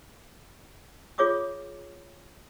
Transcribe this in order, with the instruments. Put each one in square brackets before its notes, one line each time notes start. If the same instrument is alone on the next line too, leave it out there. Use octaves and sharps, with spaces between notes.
[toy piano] F4 G#4 C#5 E5 D6 D#6